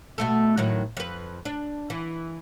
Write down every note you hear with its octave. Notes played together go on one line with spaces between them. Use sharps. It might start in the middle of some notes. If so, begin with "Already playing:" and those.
B2 A3 A4
A2 D#3 F#3
F2 B4
D4
E3